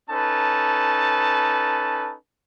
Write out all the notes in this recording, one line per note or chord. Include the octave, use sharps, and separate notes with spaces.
C#4 D#4 A4 B4 A5